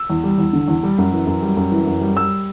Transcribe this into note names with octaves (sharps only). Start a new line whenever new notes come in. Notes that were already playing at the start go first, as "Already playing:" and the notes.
Already playing: E6
E2
G3
E2
D3
E2
G3
F#2
E3
F#2
G3
F#2
E3
F#2
G3
G3 E6